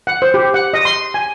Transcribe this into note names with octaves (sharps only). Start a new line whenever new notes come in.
F#5
C5
G4
F#5
D#5
C6
G#5